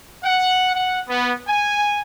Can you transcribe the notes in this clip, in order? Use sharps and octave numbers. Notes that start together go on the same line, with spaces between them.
F#5
F#5
B3
G#5